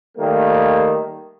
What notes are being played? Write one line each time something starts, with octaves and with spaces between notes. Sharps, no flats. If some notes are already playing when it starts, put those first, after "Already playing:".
D#3 G3 A3 A#3